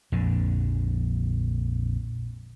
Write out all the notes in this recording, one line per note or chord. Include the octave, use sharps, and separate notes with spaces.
A#1 F2 D3